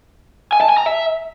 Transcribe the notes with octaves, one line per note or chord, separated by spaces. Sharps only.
G#5
A5
G#5
A#5
E5